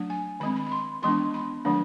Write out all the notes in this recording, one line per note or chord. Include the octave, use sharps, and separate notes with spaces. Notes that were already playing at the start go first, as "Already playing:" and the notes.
Already playing: F#3 A3 D4
G#5
D#3 G#3 C4 B5
B5
B5
C6
E3 G#3 B3 D4 C6
B5
D#3 F#3 A3 D4